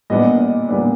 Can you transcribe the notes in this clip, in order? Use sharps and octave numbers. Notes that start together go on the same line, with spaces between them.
A#2 G3 B3 D4 D#5
D#5
A#2 G3 B3 D4